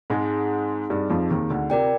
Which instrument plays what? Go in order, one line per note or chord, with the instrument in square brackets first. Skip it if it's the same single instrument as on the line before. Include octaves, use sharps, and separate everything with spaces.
[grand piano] G#2 G#3 [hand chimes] C4 D#4 G#4
[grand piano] G2 G3 [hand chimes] C4 D#4 G#4
[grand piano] F2 F3
D#2 D#3
D2 D3
[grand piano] C3 [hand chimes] F4 A#4 D5 G5